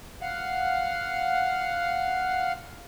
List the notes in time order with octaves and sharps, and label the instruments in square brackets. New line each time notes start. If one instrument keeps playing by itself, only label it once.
[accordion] F5 F#5